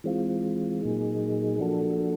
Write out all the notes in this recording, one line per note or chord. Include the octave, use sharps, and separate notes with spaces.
E3 G#3 C4 F4
A#2 F#3 A#3 D#4 G#4
F3 A#3 D4 F#4 A4